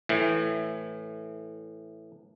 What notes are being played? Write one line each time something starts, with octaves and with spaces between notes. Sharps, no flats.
A2 E3